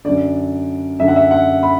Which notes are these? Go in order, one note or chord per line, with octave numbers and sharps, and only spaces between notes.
F#2 D3 D5
F#2 D3 E5
F#5
E5
F#5
B5